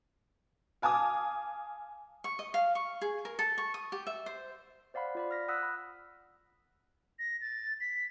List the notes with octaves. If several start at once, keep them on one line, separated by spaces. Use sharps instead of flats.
F5 G#5 A5 D6 D#6
C#6
D#5
F5
C#6
G#4
A#4
A4
C#6
D#6
G4
E5
C5
C5 D5 F5 F#5 B5
F4 D5 B5
F6 A#6 B6
F#5 D#6 E6 F#6 B6
B5
A#6
A6
B6